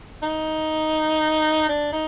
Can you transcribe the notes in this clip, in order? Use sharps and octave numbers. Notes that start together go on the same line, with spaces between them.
D#4
D4
D#4